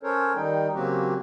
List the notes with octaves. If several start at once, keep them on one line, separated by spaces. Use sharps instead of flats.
C#4 A4 A#4 C5 C#5
D#3 G3 D#4 G5
C#3 F#3 A#3 C4 F#4 G4